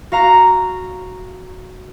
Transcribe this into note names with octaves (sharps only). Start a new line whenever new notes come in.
F#4 F5 A#5